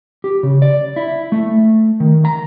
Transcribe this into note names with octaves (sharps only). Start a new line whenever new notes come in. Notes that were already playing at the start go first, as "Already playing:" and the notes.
G4
C#3
D5
E4
A3
D#3
A#5